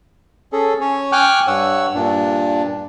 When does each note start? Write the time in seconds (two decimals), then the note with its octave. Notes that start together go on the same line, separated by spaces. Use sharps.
0.52 C#4 G#4 A4
0.81 C#4 C#5
1.12 G5 G#5 C#6 D6 F6 F#6
1.47 G2 C#5 F#5 E6
1.95 G2 A#2 D4